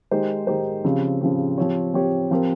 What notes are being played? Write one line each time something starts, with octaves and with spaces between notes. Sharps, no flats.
D#3 G#3 D#4 G4 C5
D#3 G#3 D#4 G4 C5
C#3 F3 C4 G4
C#3 F3 C4 G4
F3 C4 G4 C#5
F3 C4 G4 C#5
F3 C4 G4 A#4